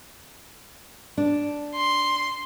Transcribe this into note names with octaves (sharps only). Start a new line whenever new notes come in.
D4
C6